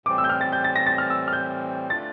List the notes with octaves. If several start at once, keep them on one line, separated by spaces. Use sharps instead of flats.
A2 E3 G3 C4 D6
E6
G6
F6
A6
G6
A6
A#6
A6
F6
E6
F6
G6
D3 A3 D4 F4 A6